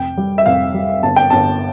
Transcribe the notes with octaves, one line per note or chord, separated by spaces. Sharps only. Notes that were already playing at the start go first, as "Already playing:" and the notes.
Already playing: F1 G5
G3
E5
F1 F5
G3
G1 A5
G5
G1 A5